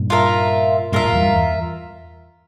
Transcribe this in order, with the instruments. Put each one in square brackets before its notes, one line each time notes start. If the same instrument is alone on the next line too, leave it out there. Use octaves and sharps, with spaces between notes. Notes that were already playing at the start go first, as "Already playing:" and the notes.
Already playing: [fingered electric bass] G2 A#2
[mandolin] F4 A#4 E5
[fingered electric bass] G2 A#2 [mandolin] F4 A#4 E5
[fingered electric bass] G#2
E2 G2
E2